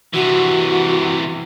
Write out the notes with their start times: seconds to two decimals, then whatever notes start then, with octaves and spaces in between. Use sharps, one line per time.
0.13 C3 E3 F#4